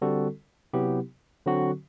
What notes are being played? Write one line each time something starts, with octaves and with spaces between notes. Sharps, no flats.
D3 G3 C4 F#4 A4
C3 F#3 B3 E4 G4
D3 F#3 C4 F#4